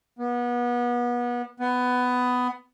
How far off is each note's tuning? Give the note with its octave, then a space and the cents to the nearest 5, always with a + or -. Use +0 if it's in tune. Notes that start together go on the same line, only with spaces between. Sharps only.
B3 -30
B3 +15